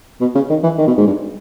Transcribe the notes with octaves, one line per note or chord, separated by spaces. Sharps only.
B2
C#3
D#3
E3
D#3
B2
G#2
G2